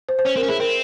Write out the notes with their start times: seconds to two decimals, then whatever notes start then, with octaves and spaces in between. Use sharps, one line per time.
0.09 C5
0.19 C5
0.25 C#4 C#5
0.36 C4 A#4
0.43 C#4
0.49 E4 G#4
0.60 C4 A#4